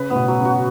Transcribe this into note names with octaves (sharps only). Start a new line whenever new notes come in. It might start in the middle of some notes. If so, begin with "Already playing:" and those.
Already playing: C#3 B4
A2 B3
B2
F#3
C#3
F#4